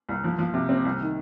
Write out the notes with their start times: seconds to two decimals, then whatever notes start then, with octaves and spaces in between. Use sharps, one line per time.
0.09 C2
0.24 F3
0.39 F3
0.54 C3
0.69 C4
0.85 C2
1.00 D#3